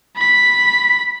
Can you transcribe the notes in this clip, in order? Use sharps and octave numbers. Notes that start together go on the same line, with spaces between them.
B5 B6